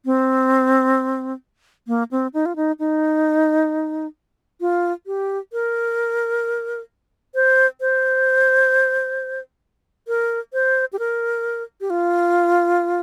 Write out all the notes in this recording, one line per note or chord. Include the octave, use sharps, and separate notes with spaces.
C4
A#3
C4
D#4
F4
D#4
D#4
F4
G4
A#4
C5
C5
A#4
C5
G4
A#4
G4
F4